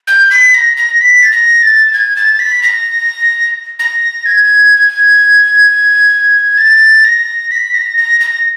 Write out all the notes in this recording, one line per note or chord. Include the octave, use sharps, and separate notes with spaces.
G6
B6
A#6
A#6
B6
A6
A#6
A6
G#6
A6
B6
A#6
A#6
G#6
A6
A#6
B6
A#6
A#6
A#6